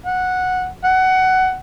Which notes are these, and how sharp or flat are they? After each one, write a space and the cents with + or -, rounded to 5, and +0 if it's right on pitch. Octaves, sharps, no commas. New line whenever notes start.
F#5 -10
F#5 +15